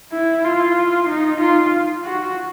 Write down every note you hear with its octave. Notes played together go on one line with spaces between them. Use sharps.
E4
F4
D#4
F4
F#4